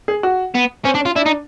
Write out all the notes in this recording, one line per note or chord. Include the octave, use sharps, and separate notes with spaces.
G#4
F#4
B3
C4 C#4
D4
C#4
F4
D4 E4
D#4